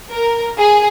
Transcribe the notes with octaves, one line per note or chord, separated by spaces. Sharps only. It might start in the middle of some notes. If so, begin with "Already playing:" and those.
A#4
G#4